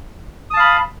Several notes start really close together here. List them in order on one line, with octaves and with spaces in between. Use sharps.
D#6 A5 F5 B5